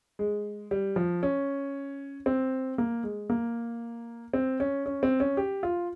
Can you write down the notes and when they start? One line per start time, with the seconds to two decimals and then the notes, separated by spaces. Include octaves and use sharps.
0.19 G#3
0.71 G3
0.96 F3
1.23 C#4
2.26 C4
2.78 A#3
3.03 G#3
3.30 A#3
4.33 C4
4.60 C#4
4.86 C#4
5.03 C4
5.20 C#4
5.37 G4
5.63 F4